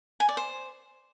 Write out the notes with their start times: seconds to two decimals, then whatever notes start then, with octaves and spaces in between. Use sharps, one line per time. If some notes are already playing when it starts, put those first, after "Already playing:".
0.20 G#5
0.29 D5
0.37 C5